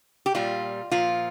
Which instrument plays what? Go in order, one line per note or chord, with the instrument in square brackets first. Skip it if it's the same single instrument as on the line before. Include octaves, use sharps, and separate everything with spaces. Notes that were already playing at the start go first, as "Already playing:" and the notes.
[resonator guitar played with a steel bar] G4
A#2 G3 F4
A#2 F3 F4